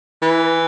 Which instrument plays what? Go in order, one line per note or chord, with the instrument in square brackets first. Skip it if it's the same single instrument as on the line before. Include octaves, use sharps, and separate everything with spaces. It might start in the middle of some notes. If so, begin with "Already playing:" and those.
[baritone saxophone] E3